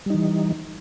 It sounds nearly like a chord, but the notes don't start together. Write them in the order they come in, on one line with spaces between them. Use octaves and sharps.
G3 D#4 E3